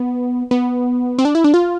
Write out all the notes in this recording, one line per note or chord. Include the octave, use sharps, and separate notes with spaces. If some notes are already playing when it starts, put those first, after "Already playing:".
Already playing: B3
B3
C4
D4
E4
D4
F4